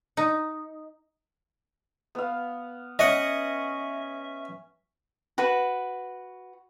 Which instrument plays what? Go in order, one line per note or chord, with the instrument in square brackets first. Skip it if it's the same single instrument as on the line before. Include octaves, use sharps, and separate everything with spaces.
[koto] D#4
[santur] B3 F5
[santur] C#4 [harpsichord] D#5 F#5 [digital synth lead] E5
[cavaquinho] F#4 B4